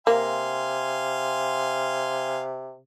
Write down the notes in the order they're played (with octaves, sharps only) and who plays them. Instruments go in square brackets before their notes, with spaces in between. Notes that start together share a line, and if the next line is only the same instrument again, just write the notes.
[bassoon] C3 [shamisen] A#3 [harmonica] F5 G#5 C6